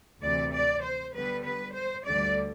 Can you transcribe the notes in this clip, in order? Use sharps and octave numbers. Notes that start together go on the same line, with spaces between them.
D2 C3 E3 D5
D5
C5
D3 G3 B3 B4
B4
C5
D2 D3 G3 D5